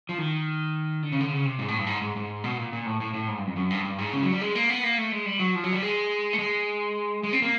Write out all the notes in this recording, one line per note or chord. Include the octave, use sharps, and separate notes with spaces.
F3
D#3
D3
C#3
D3
C#3
C3
G#2
A2
G2
G#2
G#2
G#2
B2
A#2
A#2
A2
A2
A2
G#2
G2
F2
F#2
G2
G2
G#2
C#3
F#3
G3
G#3
A#3
B3
A#3
A3
G#3
G3
F#3
F3
F#3
G3
G#3
A3
G#3
G#3
C4
A#3